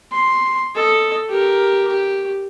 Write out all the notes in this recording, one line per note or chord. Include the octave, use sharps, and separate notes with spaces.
C6
A4 D#5
G4 A#4
G4